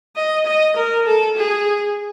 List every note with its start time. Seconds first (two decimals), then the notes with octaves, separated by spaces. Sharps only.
0.16 D#5
0.46 D#5
0.76 A#4
1.06 A4
1.36 G#4